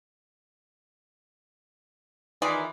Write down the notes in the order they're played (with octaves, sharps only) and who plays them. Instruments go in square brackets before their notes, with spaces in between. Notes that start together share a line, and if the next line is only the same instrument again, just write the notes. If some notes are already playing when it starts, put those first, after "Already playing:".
[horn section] D#3 E3 [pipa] F4 G#4 D5